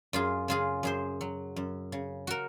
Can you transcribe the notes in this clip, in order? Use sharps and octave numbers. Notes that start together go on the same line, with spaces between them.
F#2 F4 G#4
C#3 F4 G#4
F#2 G#4 C5
F#3
F#2
C#3
F#4 A#4